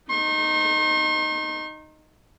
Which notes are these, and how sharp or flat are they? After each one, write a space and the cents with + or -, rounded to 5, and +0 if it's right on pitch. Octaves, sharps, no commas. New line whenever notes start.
D#4 -10 C6 +45